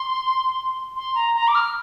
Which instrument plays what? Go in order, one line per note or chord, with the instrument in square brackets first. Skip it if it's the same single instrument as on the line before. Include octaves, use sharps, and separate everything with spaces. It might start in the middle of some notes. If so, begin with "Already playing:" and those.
Already playing: [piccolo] C6
C6
A#5
A#5
D6
F6